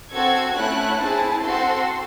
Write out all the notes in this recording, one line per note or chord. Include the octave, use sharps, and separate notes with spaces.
C4 F#4 A4 G#6
A3 C#4 E4 F#6
C4 E4 G#4 A5
C4 F#4 A4 C6